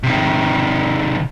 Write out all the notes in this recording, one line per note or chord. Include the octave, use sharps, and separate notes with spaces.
C3 D#3